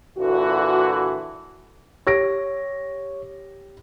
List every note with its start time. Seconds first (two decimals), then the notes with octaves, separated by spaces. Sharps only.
0.18 A#2 D3 E3 F#4
2.07 G4 C#5 A#6 D7